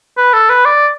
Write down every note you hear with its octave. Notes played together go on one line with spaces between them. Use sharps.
B4
A4
B4
D5